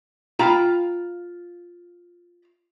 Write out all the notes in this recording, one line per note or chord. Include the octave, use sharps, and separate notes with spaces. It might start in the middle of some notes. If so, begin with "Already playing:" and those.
F4 F5 G5 A#5 B5